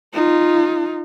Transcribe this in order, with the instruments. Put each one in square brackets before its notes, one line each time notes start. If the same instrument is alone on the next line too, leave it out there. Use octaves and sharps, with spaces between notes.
[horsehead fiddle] D#4 F4